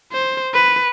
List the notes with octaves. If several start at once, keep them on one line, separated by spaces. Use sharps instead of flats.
C5
B4